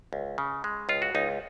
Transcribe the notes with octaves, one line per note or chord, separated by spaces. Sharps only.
C#2
C#3
G#3
C#2 F4
F#4
C#2 D#4